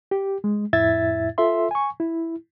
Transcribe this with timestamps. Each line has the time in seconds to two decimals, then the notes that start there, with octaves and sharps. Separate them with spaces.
0.11 G4
0.44 G#3
0.73 F2 A2 E4 E5 G#6 A6
1.38 F4 A4 E5 C6
1.71 G#5 C#6
2.00 E4